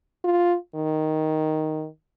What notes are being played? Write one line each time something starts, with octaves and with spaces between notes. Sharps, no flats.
F4
D#3